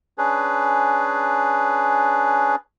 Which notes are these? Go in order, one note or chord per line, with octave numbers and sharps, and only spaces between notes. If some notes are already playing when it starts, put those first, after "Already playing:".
C#4 D4 G#4 B4